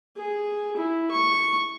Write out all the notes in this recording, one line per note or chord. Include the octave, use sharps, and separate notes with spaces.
G#4
E4
C#6